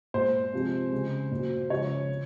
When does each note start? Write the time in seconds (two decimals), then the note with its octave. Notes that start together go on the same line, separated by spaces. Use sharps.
0.14 A#2 G#3 C5
0.53 C3 F3 G#3
0.92 C#3 G#3
1.31 A#2 F#3
1.70 C#3 F3 G#3 C#5
2.09 C#3